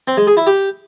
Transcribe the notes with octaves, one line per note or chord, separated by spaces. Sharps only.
C4
G#3
G#4
E4
G4